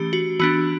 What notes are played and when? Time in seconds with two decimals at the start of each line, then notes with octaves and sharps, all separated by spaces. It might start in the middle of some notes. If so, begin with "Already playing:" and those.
Already playing: E3 A3 C#4 G4
0.13 F#4
0.40 E3 B3 D4 F#4